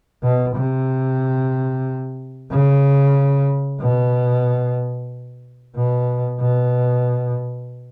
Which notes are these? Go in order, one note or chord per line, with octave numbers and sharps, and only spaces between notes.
B2
C3
C#3
B2
B2
B2